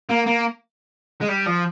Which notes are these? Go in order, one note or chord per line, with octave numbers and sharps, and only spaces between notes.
A#3
A#3
G#3
G3
F3